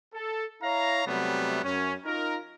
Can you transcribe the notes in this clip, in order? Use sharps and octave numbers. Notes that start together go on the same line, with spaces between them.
A4
E4 C#5 F5 A#5
C3 F#3 G3 A3 B3
F#2 C#4
D#4 F4 A#4